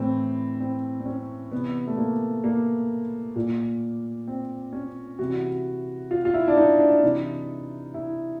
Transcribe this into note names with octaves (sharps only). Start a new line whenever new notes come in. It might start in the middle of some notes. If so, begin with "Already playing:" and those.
Already playing: A2 E3 C4
C4
C4
C#4
C3 E3 B3
A3
A#3
A#3
A#2
C4
C#4
C3 E3 F#4
F4
F4
E4
D4
D#4
D4
C3 E3 D#4
E4